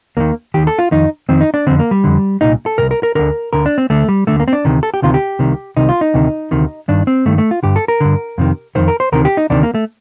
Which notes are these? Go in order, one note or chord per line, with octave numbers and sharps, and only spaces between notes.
D#2 D#3 A#3
D#2 D#3 G4
A4
F4
F2 D#3 D#4
F2 D#3 C4
D#4
D4
F2 D3 C4
A#3
G3
F2 D3
C2 A#2 D#4
A4
C2 A#2 A#4
A#4
A#4
D2 D3 A#4
D2 D3 A#4
D4
C4
D2 D3 A3
G3
D2 D3 A3
A#3
C4
D4
D2 C3 D#3
A4
G4
D2 C3 D#3 F4
G4
C2 C3 D#3
C2 C3 D#3 D#4
F4
D#4
D2 C3 D#3
D2 C3 D#3
G2 D#3 D4
C4
G2 D#3 A3
A3
F4
G2 D3 G4
A4
A#4
G2 D3
F2 C3 D#3
F2 C3 D#3 C5
A#4
C5
D2 C3 D#3 A#4
G4
D#4
D2 C3 D#3 D4
A#3
A3